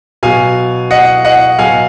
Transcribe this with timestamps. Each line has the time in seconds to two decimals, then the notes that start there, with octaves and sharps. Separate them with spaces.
0.23 B2 F#3 F5 G#5
0.91 D#5 F#5
1.25 D#5 F#5
1.59 B2 F#3 F5 G#5